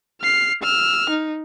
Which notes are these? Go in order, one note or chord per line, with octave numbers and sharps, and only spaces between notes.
F6 C7
E6 F6
D#4